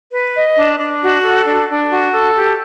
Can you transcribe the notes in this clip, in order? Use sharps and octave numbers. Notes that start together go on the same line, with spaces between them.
B4
D#5
D4
D4
F#4
A4
D4
D4
F#4
A4
G4